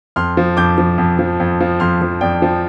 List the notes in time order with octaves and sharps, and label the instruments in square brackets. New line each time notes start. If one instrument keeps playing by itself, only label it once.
[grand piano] F2 C6 F6
F3
F2 D6 G6
F3
F2
F3
F2
F3
F2 C6 F6
F3
F2 D5 G5
F3